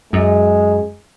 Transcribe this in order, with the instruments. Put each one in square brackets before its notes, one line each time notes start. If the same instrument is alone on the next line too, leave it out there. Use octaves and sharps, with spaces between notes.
[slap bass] F#2 [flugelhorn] G#3